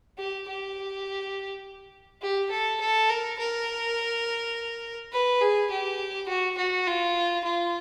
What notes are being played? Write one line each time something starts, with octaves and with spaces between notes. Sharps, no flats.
G4
G4
G4
A4
A4
A#4
A#4
B4
G#4
G4
F#4
F#4
F4
F4